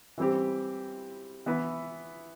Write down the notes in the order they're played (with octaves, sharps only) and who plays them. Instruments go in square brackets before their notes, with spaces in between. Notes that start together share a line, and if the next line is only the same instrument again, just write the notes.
[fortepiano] E3 G3 C4 G4
E3 B3 E4 B4